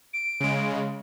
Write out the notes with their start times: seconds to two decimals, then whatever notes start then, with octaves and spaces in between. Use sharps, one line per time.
0.13 D7
0.40 C#3 G#3